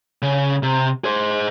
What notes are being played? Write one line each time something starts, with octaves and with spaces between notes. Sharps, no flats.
C#3
C3
G#4 C5